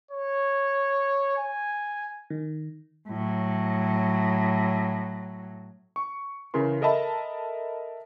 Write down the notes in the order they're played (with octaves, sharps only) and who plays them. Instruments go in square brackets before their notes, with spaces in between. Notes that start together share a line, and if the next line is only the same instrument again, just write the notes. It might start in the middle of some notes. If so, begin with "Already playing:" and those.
[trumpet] C#5
G#5
[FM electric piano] D#3
[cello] A2 F#3
[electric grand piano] C#6
C#3 E3 A#4 C6
A4 A#4 D#5 E5 A5 B5